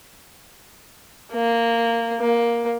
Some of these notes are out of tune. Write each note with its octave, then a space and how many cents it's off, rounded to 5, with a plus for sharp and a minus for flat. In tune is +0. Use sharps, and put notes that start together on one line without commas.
A#3 -10
A#3 +10